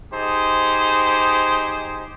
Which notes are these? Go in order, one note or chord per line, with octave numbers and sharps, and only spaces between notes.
D#4 G4 G#4 C5